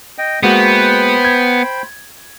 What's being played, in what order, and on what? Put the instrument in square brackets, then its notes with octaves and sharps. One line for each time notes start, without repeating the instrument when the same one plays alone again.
[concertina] D#5 G5
[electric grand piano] G#3 A#3 F#4 [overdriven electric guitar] B3 [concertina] C5 G5 B5
[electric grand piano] G#6